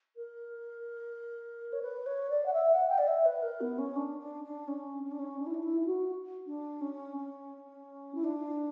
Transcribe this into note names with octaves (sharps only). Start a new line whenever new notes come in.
A#4
C#5
B4
C#5
D5
F#5
E5
F#5
G5
D5
E5
B4
A#4
B3
C#4
D4
D4
D4
C#4
C#4
D4
C#4
D4
E4
D4
E4
E4
F#4
D4
C#4
C#4
E4
D4